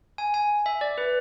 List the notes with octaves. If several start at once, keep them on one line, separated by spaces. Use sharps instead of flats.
G#5
G#5
E5
D5
B4